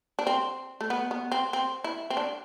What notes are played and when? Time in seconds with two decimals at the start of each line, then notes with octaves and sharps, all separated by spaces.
0.19 D4
0.27 C4
0.81 A3
0.90 B3
1.11 B3
1.32 C4
1.53 C4
1.84 E4
2.10 C4
2.17 D4